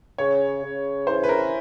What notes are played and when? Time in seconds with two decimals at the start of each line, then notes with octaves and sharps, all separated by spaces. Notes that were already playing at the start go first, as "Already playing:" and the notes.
0.18 C#3 C#5
0.62 C#3
1.07 E3 C5
1.24 B4
1.29 A#4